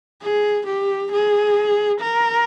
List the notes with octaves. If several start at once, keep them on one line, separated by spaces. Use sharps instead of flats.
G#4
G4
G#4
A#4